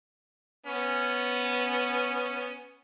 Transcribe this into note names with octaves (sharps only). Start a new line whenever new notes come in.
B3 C#4